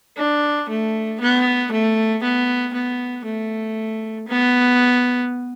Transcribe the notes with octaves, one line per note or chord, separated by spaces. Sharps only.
D4
A3
B3
A3
B3
B3
A3
B3